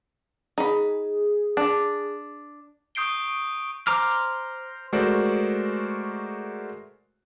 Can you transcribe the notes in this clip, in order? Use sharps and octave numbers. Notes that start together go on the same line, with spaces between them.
D#4 G#4 B5
D4
C#6 D#6 G6 C7 D7 G7
C5 A#5 D6 F6
G#3 A3 F#4 A#4 C5 D5